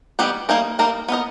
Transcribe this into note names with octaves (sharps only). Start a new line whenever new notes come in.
D#3 G3 B3 G4
G3 A#3 D#4 A#4
G3 A#3 D#4 A#4
B3 D#4 A#4 D#5